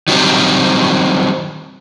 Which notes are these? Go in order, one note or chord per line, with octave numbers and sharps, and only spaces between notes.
D#3 F#3 G3 C4